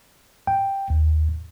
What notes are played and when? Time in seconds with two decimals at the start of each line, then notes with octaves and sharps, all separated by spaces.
0.47 G5
0.90 D#2